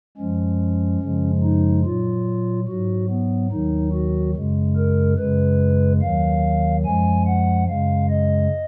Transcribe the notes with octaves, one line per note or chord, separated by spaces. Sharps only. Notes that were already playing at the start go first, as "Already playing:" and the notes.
F#2 F3 G#3 C#4
F#2 C#3 F3 G#3
D#4
A#2 F#3 F4
G#2 F#3 F#4
B3
D#2 D#3 F#3 D#4
F#4
F#2 C#3 G#3
A#4
F#2 C#3 G#3 B4
D#2 D#3 F#3 F5
F#2 F3 G#3 G#5
F#5
F#2 C#3 G#3 F5
D#5